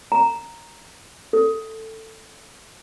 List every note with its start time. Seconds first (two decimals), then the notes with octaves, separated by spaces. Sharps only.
0.12 A#5
1.33 A4